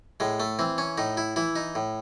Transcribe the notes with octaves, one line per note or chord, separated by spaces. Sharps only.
A2 G#3
A3
E3 C4
C#4
A2 D#4
E4
E3 E4
D#4
A2